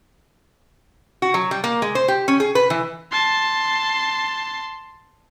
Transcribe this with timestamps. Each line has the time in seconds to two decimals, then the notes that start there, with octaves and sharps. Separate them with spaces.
1.22 F#4
1.34 F#3
1.51 G3
1.64 A#3
1.82 G#3
1.95 C5
2.08 G4
2.28 C#4
2.40 G#4
2.55 B4
2.70 E3
3.11 A5 C6